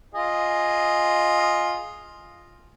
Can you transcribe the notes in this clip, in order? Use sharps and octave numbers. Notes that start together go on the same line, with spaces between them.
F4 G#4 D#5